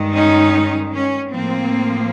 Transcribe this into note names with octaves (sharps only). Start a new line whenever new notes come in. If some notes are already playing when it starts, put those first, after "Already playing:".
Already playing: G2 D#3 G#3
C#4 D#4
C#4
A2 F3 A#3 C4